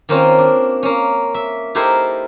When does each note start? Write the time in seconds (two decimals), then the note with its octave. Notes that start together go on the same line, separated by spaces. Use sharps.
0.09 D#3 A#3 C4 C#4 F4
0.39 D4
0.83 A#3 C#4
1.34 E5
1.75 D#4 E4 G4 A4 A#4 C5